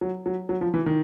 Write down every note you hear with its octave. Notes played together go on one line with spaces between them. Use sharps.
F#3
F#3
F#3
F3
E3
D#3